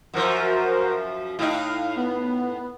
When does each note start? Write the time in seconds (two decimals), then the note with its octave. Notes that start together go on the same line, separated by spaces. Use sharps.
0.14 F#2 F3 F#4 A#4 C5
1.39 A2 D#4 F5
1.96 B3